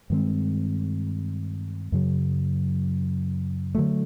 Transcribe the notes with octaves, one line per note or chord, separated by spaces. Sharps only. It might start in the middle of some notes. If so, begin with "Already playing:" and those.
G2 D#3 G#3 C4
F#2 C#3 F#3
D3 F#3 A3